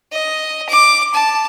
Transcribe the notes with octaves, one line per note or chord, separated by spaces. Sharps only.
D#5
D6
A5